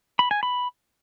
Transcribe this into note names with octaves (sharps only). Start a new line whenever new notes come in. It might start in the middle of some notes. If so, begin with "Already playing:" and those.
B5
G#5
B5